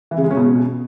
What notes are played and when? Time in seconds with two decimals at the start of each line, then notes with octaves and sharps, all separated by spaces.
0.11 E3
0.18 C#3
0.24 G#3
0.31 C#4
0.37 B2